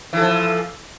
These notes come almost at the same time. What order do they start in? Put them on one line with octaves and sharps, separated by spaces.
E3 A4 F3